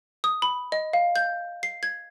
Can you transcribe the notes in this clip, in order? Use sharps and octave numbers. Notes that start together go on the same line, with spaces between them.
D#6
B5
D#5
F5
G6
C7
G#6